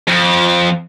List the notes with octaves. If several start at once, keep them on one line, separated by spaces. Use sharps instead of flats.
F2